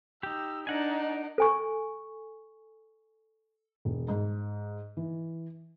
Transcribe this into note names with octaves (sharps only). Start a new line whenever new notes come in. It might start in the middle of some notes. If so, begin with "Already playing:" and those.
D#4 G4 E6
D4 D#4 A#4 F#5 G#5
A4 G#5 C#6
E1
G#2
E3